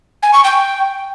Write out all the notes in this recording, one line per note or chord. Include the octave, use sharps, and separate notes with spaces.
G#5
C#6
G5